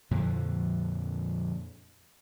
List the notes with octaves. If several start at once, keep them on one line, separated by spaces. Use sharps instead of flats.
F2 A#2 D3 F3